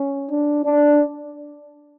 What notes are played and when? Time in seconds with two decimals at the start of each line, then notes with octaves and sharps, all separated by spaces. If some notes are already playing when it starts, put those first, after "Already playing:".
Already playing: C#4
0.29 D4
0.65 D4